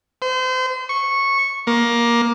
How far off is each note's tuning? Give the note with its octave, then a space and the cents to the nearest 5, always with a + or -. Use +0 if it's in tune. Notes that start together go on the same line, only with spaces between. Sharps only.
C5 -35
C#6 -10
A#3 +15